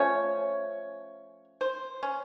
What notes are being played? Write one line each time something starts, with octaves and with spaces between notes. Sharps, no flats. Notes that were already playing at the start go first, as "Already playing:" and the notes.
Already playing: F3 A3 C#4 C#5
C5
C#4